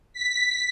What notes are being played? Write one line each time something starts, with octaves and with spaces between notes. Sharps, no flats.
B6